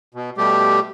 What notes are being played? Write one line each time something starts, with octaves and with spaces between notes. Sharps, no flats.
B2
B2 G3 A3 G4